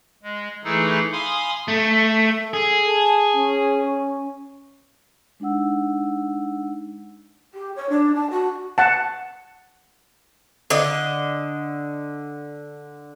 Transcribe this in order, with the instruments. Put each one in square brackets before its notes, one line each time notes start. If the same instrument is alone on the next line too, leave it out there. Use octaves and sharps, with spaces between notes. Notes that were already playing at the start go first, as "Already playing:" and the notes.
[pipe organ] G#3
E3 A3 D#4 E4 G#4 A4
F5 G#5 B5 C6 D#6
[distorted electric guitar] A3 [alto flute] A4
[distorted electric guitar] G#4
[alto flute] A5
C#4
[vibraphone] G#3 D4 D#4 F#5 E6
[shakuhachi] G4
C#5
D4
A5
F#4
[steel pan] F#5 A5
[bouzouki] D3 D#5